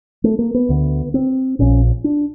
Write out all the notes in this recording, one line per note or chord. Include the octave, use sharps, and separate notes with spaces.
A3
A#3
B3
D2 D3
C4
A#1 A#2 C#4
D4